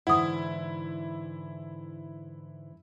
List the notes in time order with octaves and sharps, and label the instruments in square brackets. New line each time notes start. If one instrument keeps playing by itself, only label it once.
[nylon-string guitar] G#2 D3 E3 [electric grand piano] E4 [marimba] F#5 D#6